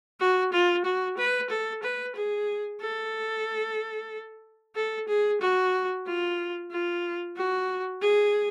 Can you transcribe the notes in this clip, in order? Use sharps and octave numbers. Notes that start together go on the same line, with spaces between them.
F#4
F4
F#4
B4
A4
B4
G#4
A4
A4
G#4
F#4
F4
F4
F#4
G#4